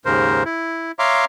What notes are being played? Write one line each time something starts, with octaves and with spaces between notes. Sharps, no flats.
D#2 G#2 C#3 A#4 C5
E4
C#5 E5 F5 A#5 C6 D6